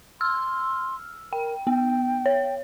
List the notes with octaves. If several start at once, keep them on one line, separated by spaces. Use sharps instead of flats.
C6 E6 F6
A#4 G5
B3 G5
C#5